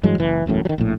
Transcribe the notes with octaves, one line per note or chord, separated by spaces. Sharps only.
G2 E3 F#3 G#3
F#1 E3
E1 A1 F#2 A2
D#3 F#3
A#1 A2